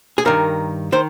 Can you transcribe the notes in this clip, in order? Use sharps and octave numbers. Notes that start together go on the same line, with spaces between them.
G#4
G2 D#3 A#4
D#3 C5